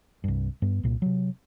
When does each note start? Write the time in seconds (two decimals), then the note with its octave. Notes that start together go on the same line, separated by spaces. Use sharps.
0.24 C2 G2
0.62 G2 B3
0.83 C2 A#2
1.02 C3 F#3